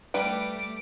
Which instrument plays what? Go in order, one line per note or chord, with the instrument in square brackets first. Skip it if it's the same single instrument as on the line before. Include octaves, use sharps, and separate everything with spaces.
[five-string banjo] G3 B4 G5 [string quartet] A3 D6